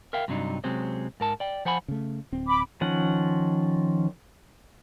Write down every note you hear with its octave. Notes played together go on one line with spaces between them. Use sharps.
A#4 E5 F5 G5
G2 C3 F#3 D4 D#4
C3 F#3 G#3 C4 C#4
G#2 A#4 A5
D5 G5
F3 C5 F#5 G#5 B5
C#3 A3
D1 C4
B5 D6
D#3 F3 C#4 F#5